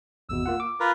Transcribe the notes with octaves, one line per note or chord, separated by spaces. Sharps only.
G#1 E2 B2 E6
A#3 F4 F#5
D6
F4 A#4 B4